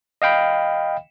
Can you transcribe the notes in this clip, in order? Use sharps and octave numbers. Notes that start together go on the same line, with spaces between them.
D#5 F5 G5 B5